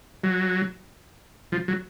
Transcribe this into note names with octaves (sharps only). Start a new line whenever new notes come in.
F#3
F3
F#3